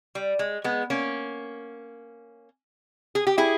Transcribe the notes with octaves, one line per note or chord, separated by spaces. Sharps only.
G3
G#3
G#3 B3
A#3 C#4
G#4
G4
E4 G#4